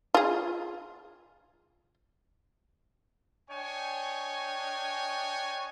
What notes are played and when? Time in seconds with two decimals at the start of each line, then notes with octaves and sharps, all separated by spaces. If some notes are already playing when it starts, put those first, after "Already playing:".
0.14 F4 G#4
3.49 D4 C#5 D#5 G5 G#5 C#6